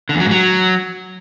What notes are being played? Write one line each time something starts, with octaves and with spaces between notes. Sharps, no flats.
D3
E2
F#3
G#2
F#3